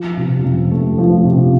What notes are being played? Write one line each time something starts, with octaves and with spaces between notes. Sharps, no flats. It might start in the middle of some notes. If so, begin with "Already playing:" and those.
Already playing: F3
C3
F2
A3
F3
C3